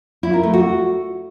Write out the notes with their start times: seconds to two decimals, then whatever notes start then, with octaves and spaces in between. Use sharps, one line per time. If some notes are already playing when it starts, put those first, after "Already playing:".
0.23 E4
0.33 A#4
0.43 A3
0.53 F#4